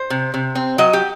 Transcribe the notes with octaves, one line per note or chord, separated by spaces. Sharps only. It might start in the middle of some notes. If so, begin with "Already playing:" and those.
Already playing: C5
C3
C3
C4
F#3 D#5
G4